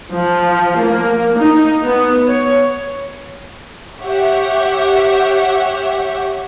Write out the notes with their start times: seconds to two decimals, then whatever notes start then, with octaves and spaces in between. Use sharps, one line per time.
0.12 F3
0.80 A#3
1.38 D#4
1.84 B3
2.28 C#5
4.00 G4 C#5 E5 F#5